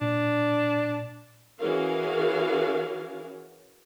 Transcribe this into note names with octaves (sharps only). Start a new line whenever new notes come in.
A#2 D4
E3 C#4 F#4 G#4 A#4 F5